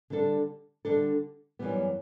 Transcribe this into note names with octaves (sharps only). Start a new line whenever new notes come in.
D3 G3 D4 A4
D3 G3 D4 A4
F#2 E3 G3 B3